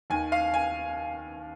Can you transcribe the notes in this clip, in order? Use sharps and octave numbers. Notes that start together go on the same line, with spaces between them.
D#2 D#3 G#5
F5
G#5